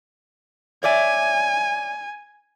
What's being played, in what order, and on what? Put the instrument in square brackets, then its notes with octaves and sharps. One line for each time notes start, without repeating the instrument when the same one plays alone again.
[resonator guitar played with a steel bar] C#5 D5 E5 [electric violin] G#5